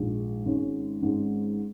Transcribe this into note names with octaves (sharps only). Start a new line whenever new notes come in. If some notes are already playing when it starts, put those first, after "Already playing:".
Already playing: A#1 G#2 G#3
G#1 G#2 G#3 C#4
G#1 G#2 G#3 C#4